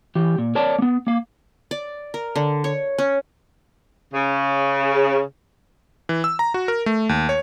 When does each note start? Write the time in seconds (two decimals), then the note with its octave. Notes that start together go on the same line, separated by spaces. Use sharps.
0.15 E3 G4
0.38 A#2
0.55 A#4 C#5 D5 A5
0.79 A#3 B3
1.07 A#3 F5
1.71 D5
2.14 A#4
2.36 D3
2.64 C#5
2.98 C#4
4.13 C#3
6.09 E3
6.24 E6
6.39 A#5
6.54 F#4
6.68 A#4
6.86 A3
7.09 D#2
7.29 C#5